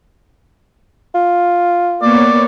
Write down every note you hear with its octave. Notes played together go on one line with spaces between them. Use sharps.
F4
A#3 B3 C#5 D5